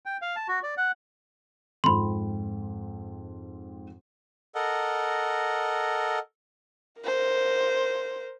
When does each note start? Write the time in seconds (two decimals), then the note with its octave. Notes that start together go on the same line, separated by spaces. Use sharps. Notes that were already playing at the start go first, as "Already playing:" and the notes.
0.06 G5
0.22 F5
0.36 A5
0.48 F#4
0.63 D5
0.77 F#5
1.84 F2 G#2 C4 B5 C6
4.55 A4 A#4 D#5 F#5
7.01 A#4 C5